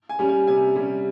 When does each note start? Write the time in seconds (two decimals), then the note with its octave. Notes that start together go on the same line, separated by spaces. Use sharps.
0.09 G#5
0.19 G3 C#4
0.29 G#5
0.47 C3 G#5
0.75 G3 C#4